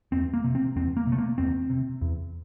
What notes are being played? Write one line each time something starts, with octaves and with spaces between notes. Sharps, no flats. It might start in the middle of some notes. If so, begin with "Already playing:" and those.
E2 C4
A#3
C3
C4
E2 C4
A#3
C3
A3
A#3
E2 C4
C3
E2